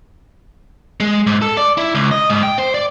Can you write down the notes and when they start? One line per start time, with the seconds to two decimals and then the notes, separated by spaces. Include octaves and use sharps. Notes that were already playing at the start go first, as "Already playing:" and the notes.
1.00 G#3
1.27 G#2
1.42 A4
1.57 D5
1.78 E4
1.95 C#2
2.11 D#5
2.30 G#2
2.43 G5
2.58 C5
2.74 D5